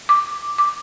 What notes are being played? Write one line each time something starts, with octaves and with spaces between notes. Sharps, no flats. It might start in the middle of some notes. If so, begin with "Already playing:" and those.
D6
D6